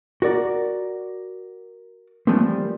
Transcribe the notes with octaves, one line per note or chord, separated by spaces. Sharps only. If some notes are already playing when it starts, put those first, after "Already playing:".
F#4 A#4 D5
E3 F3 G3 A3 A#3 C4